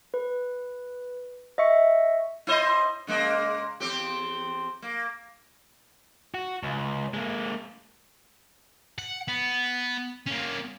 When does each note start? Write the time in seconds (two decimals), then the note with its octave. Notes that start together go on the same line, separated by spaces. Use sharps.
0.14 B4
1.58 D#5 E5 C#6 C#7
2.47 E4 C5 D#5
3.07 C#3 G#3 A#3
3.80 E2 C4 G4
4.82 A#3
6.34 F#4
6.63 C#2
7.14 G#3 A#3
8.98 F#5
9.28 B3
10.27 A#3 C#4